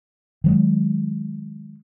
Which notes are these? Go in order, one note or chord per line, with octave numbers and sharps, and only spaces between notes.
D#3 F#3 G#3